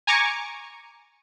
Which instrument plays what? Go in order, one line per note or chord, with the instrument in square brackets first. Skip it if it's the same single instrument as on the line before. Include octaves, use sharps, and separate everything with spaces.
[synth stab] G#5 A#5 C#6 D6 G#6 C#7